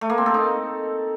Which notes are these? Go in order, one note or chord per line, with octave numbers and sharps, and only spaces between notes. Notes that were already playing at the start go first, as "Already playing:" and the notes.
A3
A#3
C4
A4
D#4